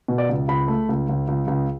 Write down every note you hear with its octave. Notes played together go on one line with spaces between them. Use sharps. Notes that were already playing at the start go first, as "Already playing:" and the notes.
B2
D5
C#2
C#2 B5
A3
C#2
C#2
C#2
C#2